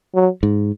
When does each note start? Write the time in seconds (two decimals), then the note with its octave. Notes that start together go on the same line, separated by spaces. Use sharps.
0.14 F#3
0.43 G#2